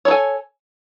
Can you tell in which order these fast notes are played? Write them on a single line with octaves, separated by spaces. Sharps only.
C#5 A4 G#5